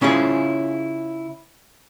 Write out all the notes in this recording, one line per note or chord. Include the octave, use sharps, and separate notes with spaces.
C#3 C#4 E4 F4 G#4